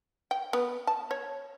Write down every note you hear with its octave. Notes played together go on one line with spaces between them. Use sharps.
G5
B3
A5
C#5